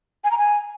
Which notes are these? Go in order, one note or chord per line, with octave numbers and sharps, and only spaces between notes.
G#5
A#5
G#5